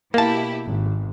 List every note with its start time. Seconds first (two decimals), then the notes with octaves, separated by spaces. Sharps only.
0.14 B2 A#3 E4 G4 A5
0.65 G#1